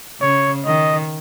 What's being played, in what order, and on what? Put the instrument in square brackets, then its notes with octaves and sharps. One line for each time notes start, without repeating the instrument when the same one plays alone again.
[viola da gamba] C#3 [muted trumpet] C#5
[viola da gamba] D#3 [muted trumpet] D#5